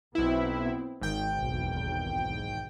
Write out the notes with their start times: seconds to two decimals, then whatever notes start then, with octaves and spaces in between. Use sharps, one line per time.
0.15 B1 B3 C4 E4
1.01 G#1 D#3 G5
1.38 B1 E2